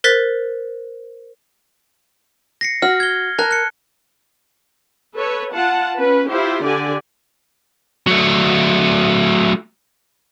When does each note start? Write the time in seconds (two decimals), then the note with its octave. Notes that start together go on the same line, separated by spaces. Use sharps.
0.04 A#4 C5 F#6 A6 B6
2.61 A#6 C7 C#7
2.82 F#4 F6
3.00 G#6 G7
3.39 A#4 A5 F#6
3.51 F#6 C#7
5.16 A4 B4 C#5
5.54 F4 F#5 A5
5.97 C#4 B4
6.30 E4 F4 G4 C5
6.64 D3 G4 D5 G#5
8.07 F#3 A3